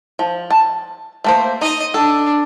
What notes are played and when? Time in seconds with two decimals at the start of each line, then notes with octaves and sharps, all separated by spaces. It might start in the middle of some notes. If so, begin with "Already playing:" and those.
0.19 F3
0.50 A5
1.24 A3 A#3 C5
1.61 D#4 D#5
1.94 D4 A4